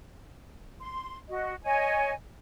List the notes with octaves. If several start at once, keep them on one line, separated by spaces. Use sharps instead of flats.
C6
F#4 D#5
C#5 D#5 G#5